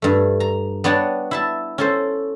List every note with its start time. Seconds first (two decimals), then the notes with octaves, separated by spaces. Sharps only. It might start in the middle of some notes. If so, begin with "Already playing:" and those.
0.02 G2 A3
0.40 A#5
0.84 B3 D4 C#5 F#5 G5 A5
1.31 E4 E5 A5
1.78 C#4 A4 C5